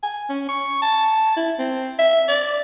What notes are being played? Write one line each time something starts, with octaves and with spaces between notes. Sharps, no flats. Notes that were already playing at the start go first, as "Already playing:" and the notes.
G#5
C#4
C#6
A5
E4
C4
E5
D5